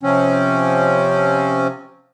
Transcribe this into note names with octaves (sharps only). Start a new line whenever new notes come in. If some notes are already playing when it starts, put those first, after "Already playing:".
C3 F3 C4 C#4